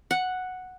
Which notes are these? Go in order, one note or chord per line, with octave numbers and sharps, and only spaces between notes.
F#5